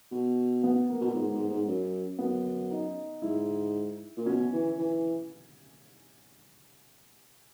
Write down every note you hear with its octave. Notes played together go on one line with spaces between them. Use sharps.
B2
B3
A#3
B2
A#2
G#2
G#2
G#2
F#2
F#2 B3
D#4
G#2 E4
A#2
B2 C#4
E3
E3